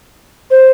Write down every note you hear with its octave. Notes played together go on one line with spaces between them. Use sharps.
C5